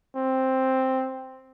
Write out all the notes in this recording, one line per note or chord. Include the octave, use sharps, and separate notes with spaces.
C4